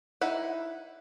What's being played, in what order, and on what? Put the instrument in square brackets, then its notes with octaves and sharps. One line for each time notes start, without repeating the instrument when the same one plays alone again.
[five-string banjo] D#4 E4 F#5